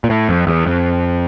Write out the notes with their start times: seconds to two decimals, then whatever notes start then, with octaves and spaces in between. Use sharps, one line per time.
0.04 A#2
0.10 A2
0.29 F2
0.47 E2
0.66 F2